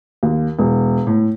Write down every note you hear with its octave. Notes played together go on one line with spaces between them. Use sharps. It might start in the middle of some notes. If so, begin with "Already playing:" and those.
D#2
E1
A2